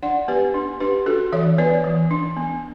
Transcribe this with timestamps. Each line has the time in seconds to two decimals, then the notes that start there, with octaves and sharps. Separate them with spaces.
0.03 D4 D5 F#5
0.28 B3 G4 B4
0.54 D4
0.80 D4 G4 B4
1.06 D4 F#4 A4
1.32 E3 C#5 E5
1.58 B3 B4 D5
1.84 E3
2.11 D4
2.37 B3